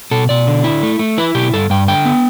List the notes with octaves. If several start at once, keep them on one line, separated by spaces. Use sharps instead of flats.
B2 A4
B2 D5
D3
E4
A3
A3
E4 B4
B2 G4
G2 A4
G2 G5
D3 G5
B3